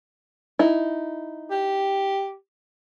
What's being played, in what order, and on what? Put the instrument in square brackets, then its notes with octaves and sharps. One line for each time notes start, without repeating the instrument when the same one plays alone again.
[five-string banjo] D#4 E4
[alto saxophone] G4